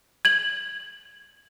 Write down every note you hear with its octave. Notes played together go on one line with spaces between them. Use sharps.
G#6 F#7